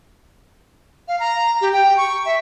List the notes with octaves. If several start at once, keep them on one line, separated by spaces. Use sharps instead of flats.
F5
A#5
G4
G5
C#6
E5